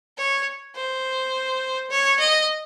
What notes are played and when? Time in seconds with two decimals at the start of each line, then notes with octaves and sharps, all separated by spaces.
0.17 C#5
0.75 C5
1.90 C#5
2.19 D#5